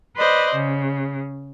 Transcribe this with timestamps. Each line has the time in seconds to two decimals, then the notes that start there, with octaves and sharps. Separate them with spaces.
0.16 B4 C5 D5 D#5
0.55 C#3